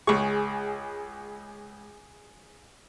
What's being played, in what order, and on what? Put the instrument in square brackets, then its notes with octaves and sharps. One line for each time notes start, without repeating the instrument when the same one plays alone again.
[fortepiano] C#2 C#6 [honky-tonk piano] G#4